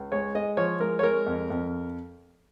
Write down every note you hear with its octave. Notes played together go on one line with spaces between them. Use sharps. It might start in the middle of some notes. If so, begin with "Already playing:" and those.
Already playing: C#2
G#3 C#5
G#3 D#5
F3 C#5
G#3 A#4
C#5
G#3 A#4
F2
F2